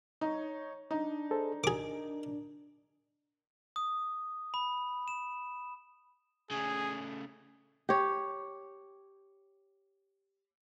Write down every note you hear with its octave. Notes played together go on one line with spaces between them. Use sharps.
D#4 C#5
D4 D#4
G#4 A4 C5
G#4 A#4 D6
D#6
B5
E7
C#3 A3 G#4
G4 C#5